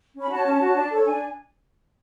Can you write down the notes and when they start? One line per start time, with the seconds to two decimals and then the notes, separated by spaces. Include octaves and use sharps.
0.16 C#4
0.22 B5
0.30 F#4 C#5 A5
0.45 C#4 A5
0.60 F#4 C#5
0.75 D4
0.90 A4 C#5
1.05 D4 G#5